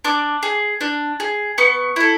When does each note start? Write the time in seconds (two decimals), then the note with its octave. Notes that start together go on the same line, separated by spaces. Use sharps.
0.04 D4 D6
0.43 G#4
0.81 D4
1.20 G#4
1.58 B3 C#6
1.96 E4 A4